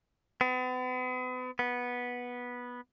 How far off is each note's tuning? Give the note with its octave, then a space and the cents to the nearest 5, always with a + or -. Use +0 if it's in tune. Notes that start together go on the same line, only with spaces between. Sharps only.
B3 +40
B3 -10